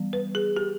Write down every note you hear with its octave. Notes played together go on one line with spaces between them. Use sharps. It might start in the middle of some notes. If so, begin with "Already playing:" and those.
Already playing: E3 G3 B3
B4
G#4
G4